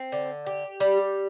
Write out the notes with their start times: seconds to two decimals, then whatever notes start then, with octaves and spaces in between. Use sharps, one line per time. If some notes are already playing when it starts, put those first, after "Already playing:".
Already playing: C4
0.12 D3
0.47 G4
0.80 G3